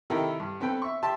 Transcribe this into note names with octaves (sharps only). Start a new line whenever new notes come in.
C3 D#3 E4 G4 A4 A#4
G2
B3 C4 A4 B4 G5
E5 C#6
G4 E5 A5 C6